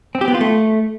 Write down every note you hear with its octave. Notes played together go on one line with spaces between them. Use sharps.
C4
G4
B3
F4
A3